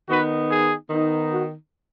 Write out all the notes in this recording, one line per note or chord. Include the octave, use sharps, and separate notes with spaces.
D#3 B3 D#4 F#4 B4
G#4
D#3 B3 D#4
F#4